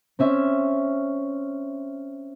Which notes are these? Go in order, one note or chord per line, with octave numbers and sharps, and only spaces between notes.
C4 C#4 E5